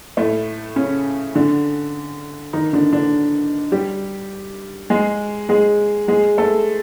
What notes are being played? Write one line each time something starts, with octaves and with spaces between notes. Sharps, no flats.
A2 A3
C#3 C#4
D3 D4
D#3 D#4
D3 D4
D3 D4
G3 G4
G#3 G#4
G#3 G#4
G#3 G#4
A3 A4